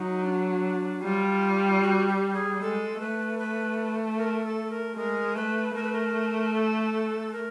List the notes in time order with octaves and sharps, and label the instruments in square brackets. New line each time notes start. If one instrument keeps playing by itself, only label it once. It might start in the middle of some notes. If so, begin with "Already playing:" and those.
Already playing: [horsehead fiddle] F#3 [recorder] D#4
[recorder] D4
[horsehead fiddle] G3 [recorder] F4
[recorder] F#4
G4
G#4
[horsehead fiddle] G#3 [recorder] A4
[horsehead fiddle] A3 [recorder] B4
[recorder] B4
A#4
A4
A#4
[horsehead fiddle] G#3 [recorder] A#4
[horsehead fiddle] A3 [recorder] B4
[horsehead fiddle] A3 [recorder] A#4
[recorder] B4
A#4
A4
A#4